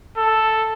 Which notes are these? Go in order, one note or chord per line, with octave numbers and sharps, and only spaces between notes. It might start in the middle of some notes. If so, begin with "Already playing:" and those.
A4